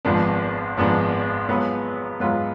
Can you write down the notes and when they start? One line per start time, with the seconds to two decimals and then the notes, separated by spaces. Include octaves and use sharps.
0.05 G#1 G#2 F3 B3 D4
0.77 G#1 G#2 F3 B3 D4
1.49 G#2 F#3 B3 F4 B4
2.20 G#2 F#3 B3 F4 B4